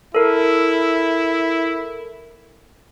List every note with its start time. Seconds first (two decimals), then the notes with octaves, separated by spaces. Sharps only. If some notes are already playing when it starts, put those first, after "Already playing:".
0.15 E4 A4 A#4